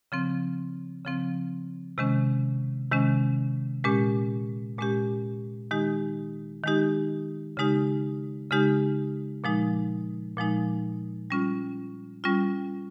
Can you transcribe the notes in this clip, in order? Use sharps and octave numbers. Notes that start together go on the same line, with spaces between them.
C#3 F3 C4
C#3 F3 C4
C3 D#3 G#3 C#4
C3 D#3 G#3 C#4
A#2 G#3 C#4 G4
A#2 G#3 C#4 G4
D#3 G#3 D#4 G4
D#3 G#3 D#4 G4
C#3 G#3 D#4 G4
C#3 G#3 D#4 G4
A#2 F3 G#3 D#4
A#2 F3 G#3 D#4
G3 C#4 F4
G3 C#4 F4